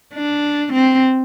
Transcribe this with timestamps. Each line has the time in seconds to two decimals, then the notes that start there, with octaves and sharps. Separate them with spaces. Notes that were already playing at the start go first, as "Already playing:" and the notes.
0.14 D4
0.73 C4